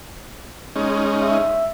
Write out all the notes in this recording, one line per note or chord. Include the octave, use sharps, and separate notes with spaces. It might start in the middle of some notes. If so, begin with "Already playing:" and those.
G#3 C#4 D#4
E5